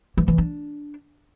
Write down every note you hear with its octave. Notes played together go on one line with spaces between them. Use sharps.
E3
E3
D4